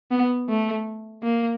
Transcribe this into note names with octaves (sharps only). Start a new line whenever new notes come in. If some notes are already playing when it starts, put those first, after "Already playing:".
B3
A3
A#3